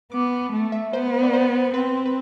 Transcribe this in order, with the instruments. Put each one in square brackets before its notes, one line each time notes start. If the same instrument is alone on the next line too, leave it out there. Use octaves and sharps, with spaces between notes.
[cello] B3 [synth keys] D6
[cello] A3
[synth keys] E5
[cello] B3 [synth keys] C5
[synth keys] D5
C5
[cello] C4 [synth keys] B4
[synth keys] B4